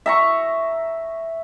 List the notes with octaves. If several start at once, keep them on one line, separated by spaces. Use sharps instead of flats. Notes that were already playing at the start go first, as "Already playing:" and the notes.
E5 A#5 C#6